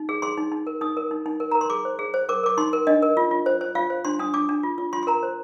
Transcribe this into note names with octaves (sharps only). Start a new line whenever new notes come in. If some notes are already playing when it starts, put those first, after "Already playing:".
Already playing: D#4
G#4
G#4 C6
D#4
D#4
A#4
D#4 D#6
A#4
D#4
D#4
A#4
A#4 A#5
C6
G#4 D6
C5
G#4
C5
A#4 D6
A#4 D6
D#4 C6
A#4
D4 D#5
A#4
F4
F4
C5
C5
F4 F5
C5
D4 C6
D4 D#6
D4 D6
D4
F4
F4
F4 C6
C6
A#4 A#5
C5